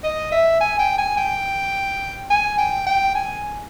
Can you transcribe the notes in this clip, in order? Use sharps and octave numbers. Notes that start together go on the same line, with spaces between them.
D#5
E5
G#5
G5
G#5
G5
G#5
G5
G5
G#5